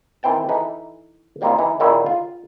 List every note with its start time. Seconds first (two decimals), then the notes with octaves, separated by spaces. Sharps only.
0.23 D#3 E3 C4 G5 A5
0.49 E3 D#4 A4 B4
1.41 F3 G3 A#3 C4 D#4 F4
1.59 E3 D#4
1.80 A#2 D#3 C#4 D#4 E4 G#4
2.06 F4